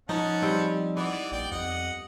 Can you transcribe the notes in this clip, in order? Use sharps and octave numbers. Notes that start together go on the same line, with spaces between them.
F3 C#4 D#4 F#5 A5
G3 C4
E3 B3 D5
A#1 D5 G5
F2 D#5 F#5